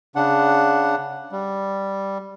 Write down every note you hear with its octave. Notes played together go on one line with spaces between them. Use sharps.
C#3 D4 F#5
G3